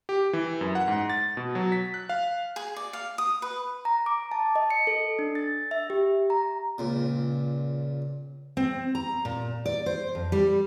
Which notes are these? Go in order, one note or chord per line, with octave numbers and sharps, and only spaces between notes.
G4
E3
F#2
F#5
G#2
A6
B2
F#3
B6
F#6
F5
G#4
D5
F5
D#6
B4
A#5
D6
A5
D#5
C#7
A4
D4
A6
E5
G4
A#5
C#2 A#2
C4
A#5
A#2
D5
C5
F2
G3